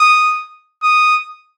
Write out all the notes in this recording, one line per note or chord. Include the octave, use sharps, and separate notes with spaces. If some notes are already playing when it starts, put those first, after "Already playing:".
Already playing: D#6
D#6